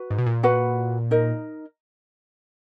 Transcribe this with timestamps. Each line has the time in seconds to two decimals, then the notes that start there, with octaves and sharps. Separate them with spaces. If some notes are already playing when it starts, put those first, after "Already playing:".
Already playing: F#4 B4
0.10 G#2
0.18 B2
0.26 A#2
0.43 F#4 B4 F#5 B5
1.11 D#4 A#4 D#5